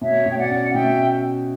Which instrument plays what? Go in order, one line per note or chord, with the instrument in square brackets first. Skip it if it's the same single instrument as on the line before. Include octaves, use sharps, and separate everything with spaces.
[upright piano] B2 [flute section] C#5 E5
[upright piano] B2
[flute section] G5
D5 F#5
[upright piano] C#4
[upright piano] B2 [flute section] E5 G5